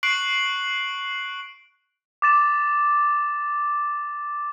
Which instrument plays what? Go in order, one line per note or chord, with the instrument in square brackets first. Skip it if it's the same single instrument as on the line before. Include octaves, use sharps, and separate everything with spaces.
[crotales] C#6 F#6 C7 D7 F#7
D6 A6 E7